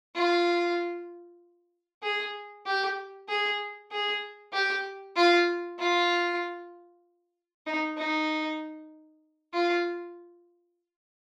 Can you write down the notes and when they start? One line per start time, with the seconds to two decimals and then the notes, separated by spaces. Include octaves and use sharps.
0.16 F4
2.03 G#4
2.66 G4
3.29 G#4
3.92 G#4
4.53 G4
5.16 F4
5.79 F4
7.66 D#4
7.97 D#4
9.54 F4